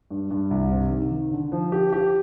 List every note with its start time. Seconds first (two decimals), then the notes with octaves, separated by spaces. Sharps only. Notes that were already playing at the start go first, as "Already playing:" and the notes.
0.10 G2
0.31 G2
0.51 C2
0.71 C3
0.91 D#3
1.11 D#3
1.32 D3
1.52 F3
1.72 G4
1.92 G4